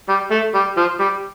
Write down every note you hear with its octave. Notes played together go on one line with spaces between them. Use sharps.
G3
A3
G3
F3
G3